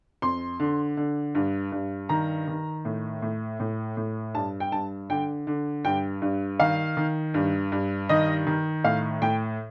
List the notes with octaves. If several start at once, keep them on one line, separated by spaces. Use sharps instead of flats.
F2 C6
D3
D3
G2
G2
D#3 A#5
D#3
A2
A2
A2
A2
G2 A5
G5
G2 A5
D3 G5
D3
G2 G5
G2
D#3 F5
D#3
G2
G2
D#3 D#5
D#3
A2 F5
A2 G5